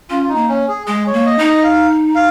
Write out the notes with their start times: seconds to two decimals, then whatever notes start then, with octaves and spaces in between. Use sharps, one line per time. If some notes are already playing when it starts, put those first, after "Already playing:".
0.10 C#4 F4
0.23 F4
0.29 D#4
0.35 A#3
0.49 C#4
0.68 G#4
0.87 G#3 G#4
1.07 C#5
1.13 A#3
1.26 D#5
1.39 D#4
1.46 D#5
1.64 F5
2.15 F5